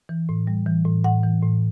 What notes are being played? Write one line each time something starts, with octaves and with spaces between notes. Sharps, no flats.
E3
A2
G3
E3
A2
A2 F#5
E3
A2